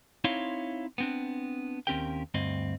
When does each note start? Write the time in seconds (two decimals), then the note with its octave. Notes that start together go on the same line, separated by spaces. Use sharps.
0.24 C4 D#4 E4 C#5 F5 C6
0.98 B3 C4 D4
1.87 D#2 C4 C#4 G4 A#4 G5
2.34 D2 G2 C4 D#5